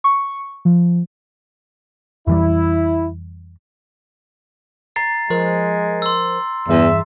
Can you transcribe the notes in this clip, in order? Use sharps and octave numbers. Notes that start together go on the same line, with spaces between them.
C#6
F3
F2 E3 G3 E4
A#5 A6 C7
F3 G#3 A#4 C5
C6 E6
E2 G2 E3 G#4 E5